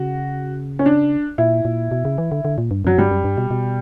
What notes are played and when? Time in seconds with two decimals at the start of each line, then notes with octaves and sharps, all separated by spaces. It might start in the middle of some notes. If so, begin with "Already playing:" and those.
Already playing: C#3 F#4
0.79 C#4
0.86 D4
1.38 A#2 E4
1.65 A#2
1.91 B2
2.05 C#3
2.18 E3
2.32 D3
2.45 D3
2.58 A#2
2.71 G2
2.85 F#2 F#3
2.98 G2 G3
3.11 F#2
3.24 G2
3.38 B2
3.51 B2